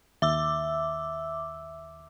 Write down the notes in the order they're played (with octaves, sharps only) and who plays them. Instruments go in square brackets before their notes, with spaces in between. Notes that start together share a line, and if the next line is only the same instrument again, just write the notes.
[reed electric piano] D#2 [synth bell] E5 D6 E6